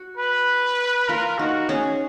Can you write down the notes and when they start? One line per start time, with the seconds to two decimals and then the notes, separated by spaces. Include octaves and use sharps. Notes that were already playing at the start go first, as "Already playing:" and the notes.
Already playing: F#4
0.17 B4
1.08 F4 A#4
1.39 D#4 F#4
1.69 C#4 G#4